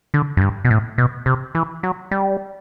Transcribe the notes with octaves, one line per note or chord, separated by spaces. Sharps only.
D3
F#2
G2
B2
A2
B2
C3
E3
F#3
G3